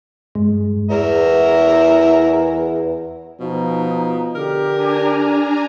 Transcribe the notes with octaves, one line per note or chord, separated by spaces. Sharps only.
G2 G#3
E2 A#4 E5 A#5
B2 F3 D#4
D3 G4 A#4
D4 G#5 A#5